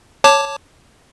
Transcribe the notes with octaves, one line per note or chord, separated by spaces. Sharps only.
C#5 A5 D6